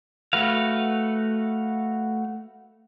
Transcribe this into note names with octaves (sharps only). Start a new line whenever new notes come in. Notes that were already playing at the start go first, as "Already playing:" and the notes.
A3 F#4 B4 F5